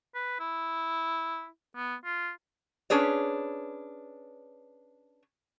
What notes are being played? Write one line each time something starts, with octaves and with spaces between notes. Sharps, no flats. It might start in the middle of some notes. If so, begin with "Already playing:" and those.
B4
E4
B3
F4
C#4 D4 G#4 B4 C#5